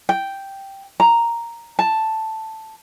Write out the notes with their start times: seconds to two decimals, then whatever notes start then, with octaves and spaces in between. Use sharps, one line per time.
0.09 G5
1.00 A#5
1.79 A5